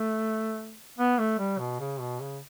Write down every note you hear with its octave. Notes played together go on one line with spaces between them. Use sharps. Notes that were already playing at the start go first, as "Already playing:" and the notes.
Already playing: A3
B3
A3
G3
B2
C#3
B2
C#3